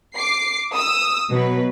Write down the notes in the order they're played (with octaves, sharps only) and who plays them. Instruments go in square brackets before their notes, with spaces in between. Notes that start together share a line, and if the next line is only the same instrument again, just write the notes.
[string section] D6 C7
D#6 E6
B2 F#3 B4